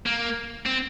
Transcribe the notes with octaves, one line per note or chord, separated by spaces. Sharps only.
A#3
C4